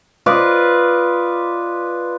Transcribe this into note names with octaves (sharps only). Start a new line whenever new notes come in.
F4 B4 D5 D#5